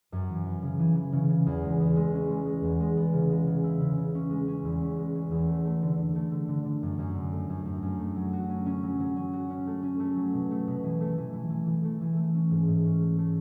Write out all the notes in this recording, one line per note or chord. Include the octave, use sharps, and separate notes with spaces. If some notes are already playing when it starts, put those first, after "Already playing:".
F#2
E3
E3
C#3
E3
E3
C#3
C#3
E2
G#3
E2
G#3
C#4
G#3
G#3
E2
G#3
B3
C#3
G#3
C#3
E4
C#3
C#3
C#4
G#3
C#4
E2
C#4
G#3
C#4
E2
A3
A3
D3
D3
A3
D3
D3
D3
F#2
F#2
D3
A3
F#2
F#2
F#2
A3
F#3
F#4
C#4
C#4
F#3
F#3
C#4
F#4
C#4
A3
C#4
A3
F#3
B2
A3
B2
E3
A3
E3
E3
E3
E3
A3
E3
A3
C#4
G#2
G#2
C#4
A3
A3